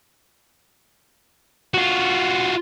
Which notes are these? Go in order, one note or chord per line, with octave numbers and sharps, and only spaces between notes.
F4 F#4